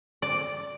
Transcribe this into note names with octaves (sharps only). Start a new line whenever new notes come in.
D5